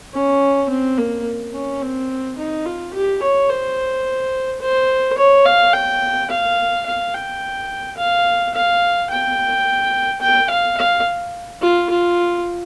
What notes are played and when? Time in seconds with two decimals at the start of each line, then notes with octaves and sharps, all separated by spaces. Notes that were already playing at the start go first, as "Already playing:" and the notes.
0.14 C#4
0.70 C4
0.98 A#3
1.54 C#4
1.82 C4
2.38 D#4
2.66 F4
2.93 G4
3.22 C#5
3.49 C5
4.61 C5
5.18 C#5
5.46 F5
5.74 G5
6.30 F5
6.86 F5
7.14 G5
7.97 F5
8.54 F5
9.10 G5
10.21 G5
10.50 F5
10.77 F5
11.62 F4
11.90 F4